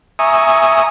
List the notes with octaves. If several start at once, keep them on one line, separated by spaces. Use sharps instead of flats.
E5 G#5 A#5 C#6 D#6